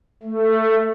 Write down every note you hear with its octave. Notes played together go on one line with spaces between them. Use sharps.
A3